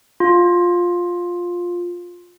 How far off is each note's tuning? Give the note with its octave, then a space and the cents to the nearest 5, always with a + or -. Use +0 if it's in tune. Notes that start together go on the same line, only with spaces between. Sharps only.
F4 +10